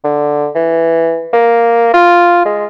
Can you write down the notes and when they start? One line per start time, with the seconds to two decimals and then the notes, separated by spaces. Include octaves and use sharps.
0.04 D3
0.55 E3
1.33 A#3
1.94 F4
2.45 G#3